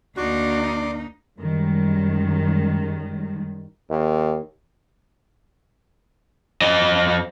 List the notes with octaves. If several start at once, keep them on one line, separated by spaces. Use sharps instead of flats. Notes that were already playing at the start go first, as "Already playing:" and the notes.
D2 A#3 D4 D#4 F#4 D5 C6 D6
F#2 D#3 G3 G#3
D#2
F2 D#5